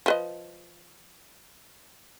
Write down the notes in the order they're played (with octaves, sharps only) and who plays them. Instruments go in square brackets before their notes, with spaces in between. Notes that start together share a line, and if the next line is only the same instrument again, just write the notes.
[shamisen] F3 B4 D#5